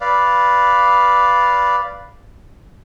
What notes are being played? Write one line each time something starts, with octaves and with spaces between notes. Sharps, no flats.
B4 D5 F5